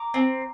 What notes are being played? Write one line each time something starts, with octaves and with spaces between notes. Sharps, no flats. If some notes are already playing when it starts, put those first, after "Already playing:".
Already playing: A#5 D6
C4